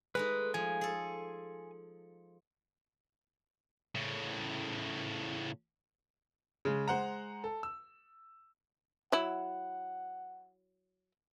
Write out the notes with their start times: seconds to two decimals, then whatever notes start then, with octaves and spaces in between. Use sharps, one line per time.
0.15 G#3 A3 D#4 B4
0.54 F3 G#5
0.81 G#4 A4
3.95 A2 C#3
6.65 C#3 G#3
6.88 G#3 C5 F#5 A#5
7.44 A4
7.63 E6
9.12 F#3 E4 F#5